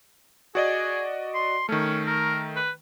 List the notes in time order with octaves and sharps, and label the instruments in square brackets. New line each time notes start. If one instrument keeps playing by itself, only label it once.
[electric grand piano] F#4 D5 D#5 [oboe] G#4
[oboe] C6
[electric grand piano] D#3 A3 [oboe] C#4
[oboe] A#4
B4